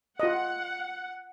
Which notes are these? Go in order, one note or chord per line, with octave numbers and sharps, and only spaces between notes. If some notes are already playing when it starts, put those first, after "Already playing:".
F4 D#5 F#5